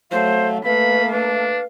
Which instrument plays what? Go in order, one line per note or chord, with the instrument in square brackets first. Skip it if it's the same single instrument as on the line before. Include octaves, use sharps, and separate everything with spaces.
[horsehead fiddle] F#3 A3 [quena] C5 [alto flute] F5
[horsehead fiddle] A3 A#3 [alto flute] B4 [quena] F5 [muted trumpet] B5
[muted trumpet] D4 [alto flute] B4